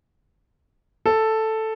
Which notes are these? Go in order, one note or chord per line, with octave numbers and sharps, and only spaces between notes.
A4